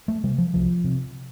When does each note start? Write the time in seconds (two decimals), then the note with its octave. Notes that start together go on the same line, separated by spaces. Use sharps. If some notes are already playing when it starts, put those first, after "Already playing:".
0.08 A3
0.24 C3 G3
0.38 F3
0.54 C2 F3
0.84 C3